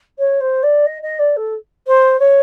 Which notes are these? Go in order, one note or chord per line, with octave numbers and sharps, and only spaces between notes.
C#5
C5
D5
D#5
D#5
D5
A4
C5
C#5